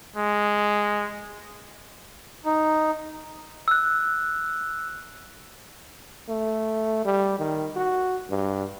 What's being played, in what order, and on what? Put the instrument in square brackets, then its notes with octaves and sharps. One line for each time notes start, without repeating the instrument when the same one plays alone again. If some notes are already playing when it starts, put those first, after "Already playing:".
[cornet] G#3
[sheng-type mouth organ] D#4
[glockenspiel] E6 F#6
[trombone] A3
G3
D#3
F#4
G2